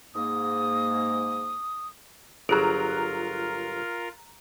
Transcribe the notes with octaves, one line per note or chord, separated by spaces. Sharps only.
G#2 A#3 D#6
G1 F#3 F4 G#4 A#4 A#5 F#6 D7